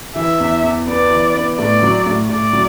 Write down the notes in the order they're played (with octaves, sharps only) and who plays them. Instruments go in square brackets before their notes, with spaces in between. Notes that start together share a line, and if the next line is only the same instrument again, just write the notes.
[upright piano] E3 [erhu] E5
[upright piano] E2
E2
[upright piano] B3 [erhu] D5
[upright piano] E3
B3
[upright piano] A2 [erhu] D5
[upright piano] F#3
A2
[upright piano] A2 [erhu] D5
[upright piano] F#3